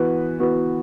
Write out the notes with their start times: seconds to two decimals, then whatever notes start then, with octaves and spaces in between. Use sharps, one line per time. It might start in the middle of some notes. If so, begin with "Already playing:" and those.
Already playing: E3 B3 F#4 B4
0.39 E3 B3 F#4 B4